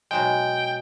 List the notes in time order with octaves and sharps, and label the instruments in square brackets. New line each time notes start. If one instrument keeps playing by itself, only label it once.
[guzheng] B2 F#3 G#3 [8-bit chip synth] G5